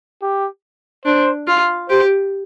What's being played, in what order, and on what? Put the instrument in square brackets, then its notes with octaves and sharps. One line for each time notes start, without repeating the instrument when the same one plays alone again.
[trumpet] G4
[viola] D4 [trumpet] C5
[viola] F4
[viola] G4 [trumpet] C5